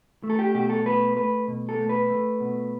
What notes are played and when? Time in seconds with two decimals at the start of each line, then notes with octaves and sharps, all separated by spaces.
0.24 A3
0.30 A4
0.39 G4
0.55 B2 G4
0.70 A4
0.86 A3 B4
1.16 A3 B4
1.48 B2
1.69 A4
1.79 A3
1.89 B4
2.10 A3
2.40 B2